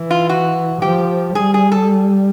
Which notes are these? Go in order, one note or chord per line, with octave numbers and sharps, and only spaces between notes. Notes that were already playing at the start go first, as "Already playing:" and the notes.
Already playing: E3
F4
F#4
F3 G4
G3 G#4
G#4
A4